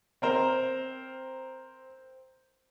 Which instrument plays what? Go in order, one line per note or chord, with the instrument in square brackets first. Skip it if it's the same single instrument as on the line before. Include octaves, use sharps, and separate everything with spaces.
[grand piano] C4 A#4 C5